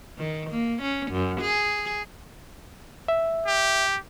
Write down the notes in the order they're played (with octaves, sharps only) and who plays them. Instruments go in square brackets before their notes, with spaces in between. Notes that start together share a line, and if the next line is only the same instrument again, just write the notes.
[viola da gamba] D#3
A#3
C#4
F#2
G#4
[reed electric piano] E5
[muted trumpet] G4